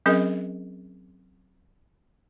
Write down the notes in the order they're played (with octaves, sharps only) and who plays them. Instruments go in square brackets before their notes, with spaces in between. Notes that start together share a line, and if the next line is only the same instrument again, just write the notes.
[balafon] F#3 C4 C#4 G#4 A#4 D#5